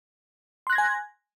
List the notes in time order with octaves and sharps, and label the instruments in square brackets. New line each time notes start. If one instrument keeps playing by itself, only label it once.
[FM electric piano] C6
F#6
A#6
G#6
G#5